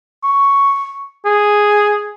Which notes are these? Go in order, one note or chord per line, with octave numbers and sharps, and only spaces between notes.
C#6
G#4